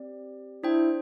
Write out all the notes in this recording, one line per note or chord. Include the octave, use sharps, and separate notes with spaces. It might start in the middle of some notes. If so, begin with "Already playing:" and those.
Already playing: C4 G4 D5
D4 E4 C5 G5